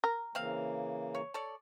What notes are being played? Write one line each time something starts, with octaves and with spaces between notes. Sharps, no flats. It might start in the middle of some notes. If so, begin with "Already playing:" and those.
A#4
C#3 E3 A#3 C4 F5
C#5
A4 C#5 D5